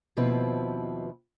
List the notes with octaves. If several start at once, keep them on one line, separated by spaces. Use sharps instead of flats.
D#2 B2 F3 C4 E4 B4